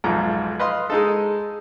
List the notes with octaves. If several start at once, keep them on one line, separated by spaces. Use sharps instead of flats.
B1 F2 G#2 A#5
B4 D#5 F5 C6
G#3 D#4 A4